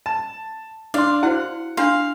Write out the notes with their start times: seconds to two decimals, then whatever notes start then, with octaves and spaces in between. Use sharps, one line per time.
0.06 A5
0.94 D4 F5 C6 D6
1.23 E4 F#4 C5 F#5
1.77 D4 F4 F5 C6